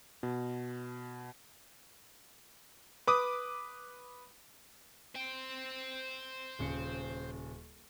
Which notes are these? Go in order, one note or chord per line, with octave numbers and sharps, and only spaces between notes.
B2
B4 D6 D#6
C5 G5
D#1 C#3 C#7